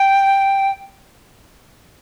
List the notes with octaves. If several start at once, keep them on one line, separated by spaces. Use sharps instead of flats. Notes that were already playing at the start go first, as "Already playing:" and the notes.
Already playing: G5